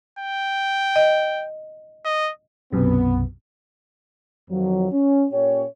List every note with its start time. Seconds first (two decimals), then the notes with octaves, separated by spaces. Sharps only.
0.19 G5
0.96 D#5
2.05 D#5
2.73 B1 F#2 C3 B3
4.51 F2 D#3 F3 F#3
4.91 C#4
5.32 A#2 C#4 G4 C#5